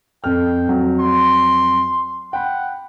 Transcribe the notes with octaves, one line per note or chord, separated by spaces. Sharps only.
F2 A4 G5 F6
F2 F#3
C6
F#5 G5 B5